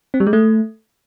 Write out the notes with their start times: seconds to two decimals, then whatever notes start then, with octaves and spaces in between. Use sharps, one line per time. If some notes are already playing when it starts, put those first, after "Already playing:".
0.14 C4
0.20 G3
0.27 G#3
0.33 A3